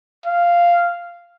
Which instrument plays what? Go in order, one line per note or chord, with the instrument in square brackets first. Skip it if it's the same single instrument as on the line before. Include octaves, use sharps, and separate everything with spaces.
[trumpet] F5